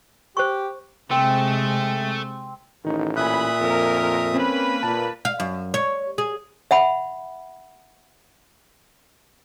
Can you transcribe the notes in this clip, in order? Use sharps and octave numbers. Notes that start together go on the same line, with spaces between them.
G4 C5 C#6
C3 G#3 A3 C4
A1 D#3 D#4
A#2 E5 G#5 B5 D#6 F#6
F2 A#4
A#3 C4 C#4 B4
A#2 A5
F5
F#2
C#5
G#4
E5 F#5 B5